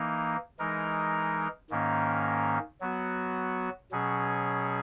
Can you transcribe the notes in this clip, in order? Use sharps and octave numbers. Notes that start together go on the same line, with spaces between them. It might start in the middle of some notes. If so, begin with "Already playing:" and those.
Already playing: E3 A#3 D#4
E3 G#3 D#4 A#4
G#2 D#3 A#3 C#4
F#3 B3 F#4
B2 F#3 C#4 G#4